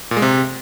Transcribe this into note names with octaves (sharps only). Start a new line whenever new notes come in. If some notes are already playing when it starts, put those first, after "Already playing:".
A#2
G#3
C3